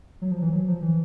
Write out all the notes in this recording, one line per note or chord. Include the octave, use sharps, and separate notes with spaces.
F#3
F3
E3
F#3
F3
E3